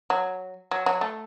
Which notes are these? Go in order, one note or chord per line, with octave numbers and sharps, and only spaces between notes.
F#3
F#3
F#3
A3